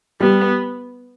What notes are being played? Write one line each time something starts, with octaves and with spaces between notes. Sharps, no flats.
G3 B3